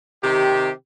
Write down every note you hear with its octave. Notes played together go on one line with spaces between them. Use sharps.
C3 D#3 G4